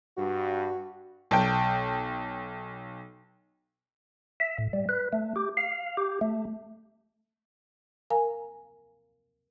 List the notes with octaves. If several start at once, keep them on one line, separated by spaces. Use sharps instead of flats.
G2 F#4
B1 G5
E5
A2
G3
B4
A3
G4
F5
G4
A3
A#4 F5 G#5 A#5